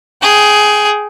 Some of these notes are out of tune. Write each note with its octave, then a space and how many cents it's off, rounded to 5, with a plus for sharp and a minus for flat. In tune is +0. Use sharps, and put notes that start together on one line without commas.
G#4 +10 G5 -10